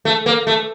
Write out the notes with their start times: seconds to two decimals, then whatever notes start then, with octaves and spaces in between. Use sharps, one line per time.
0.05 A3
0.26 A#3
0.47 A3